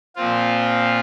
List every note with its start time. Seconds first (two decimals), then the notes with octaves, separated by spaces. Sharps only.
0.16 A#2 F3 C4 F4